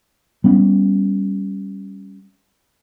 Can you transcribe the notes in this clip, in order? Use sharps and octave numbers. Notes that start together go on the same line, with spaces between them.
G3 B3 C#4